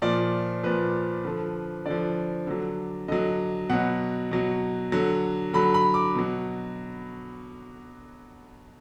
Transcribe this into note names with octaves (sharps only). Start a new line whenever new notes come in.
A#2 F3 D5
A#2 F3 B4
D3 F3
D3 F3 D5
D3 F#3
D3 F#3 D#5
B2 F#3 F#5
B2 F#3
D3 F#3
D3 F#3 B5
B5
D6
B2 F#3